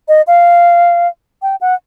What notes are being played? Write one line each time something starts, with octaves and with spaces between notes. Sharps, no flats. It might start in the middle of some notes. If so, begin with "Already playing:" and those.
D#5
F5
G5
F#5